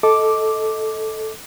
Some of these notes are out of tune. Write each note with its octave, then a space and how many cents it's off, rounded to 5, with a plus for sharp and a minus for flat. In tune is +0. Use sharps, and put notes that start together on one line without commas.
A4 -5 D#5 +15 D6 +0